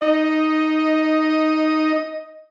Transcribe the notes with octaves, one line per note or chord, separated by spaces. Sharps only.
D#4 D#5